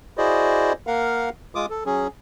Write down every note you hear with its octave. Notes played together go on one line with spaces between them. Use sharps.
E4 F#4 G#4 C5 D5 D#5
A#3 A#4 F5 F#5
G#3 F4 D6 D#6
A4
F#3 C#4 G#4